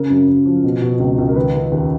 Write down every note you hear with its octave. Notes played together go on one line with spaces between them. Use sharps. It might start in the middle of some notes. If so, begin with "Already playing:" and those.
Already playing: C#3 A#4
F#2
F#2
F3
B2
B2
C#2
C#2
A#4
D#3 B4
D#3
D#2